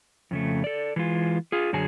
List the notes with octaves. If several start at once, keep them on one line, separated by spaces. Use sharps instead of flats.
F2 C#3 A3
A4 D5
E3 G#3 F4
F4 G#4
F#2 D3 F#3 G#4 G#5